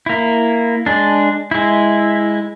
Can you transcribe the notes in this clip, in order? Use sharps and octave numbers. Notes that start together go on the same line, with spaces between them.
A#3 E4
G#3 D4
G#3 E4